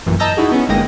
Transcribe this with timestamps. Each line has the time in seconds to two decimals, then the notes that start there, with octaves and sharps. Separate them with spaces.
0.06 A1 F#2 A#2 E3
0.19 D#5 A5 A#5 E6 G6 A#6
0.37 D#4 E4 F#4 G#4
0.52 B3 C#4
0.69 G1 G#3 A#3 G5 D#6 A#6